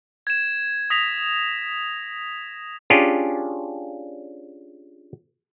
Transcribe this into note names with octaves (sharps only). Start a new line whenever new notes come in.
G#6 E7
D#6 A#6 B6 F7
C#4 D4 F4 G4 G#4